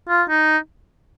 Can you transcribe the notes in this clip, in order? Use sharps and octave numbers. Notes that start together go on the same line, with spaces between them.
F4
D#4